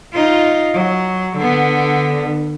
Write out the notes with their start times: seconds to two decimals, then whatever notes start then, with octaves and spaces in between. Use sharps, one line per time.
0.13 D#4 F4
0.74 F#3
1.37 D3 B3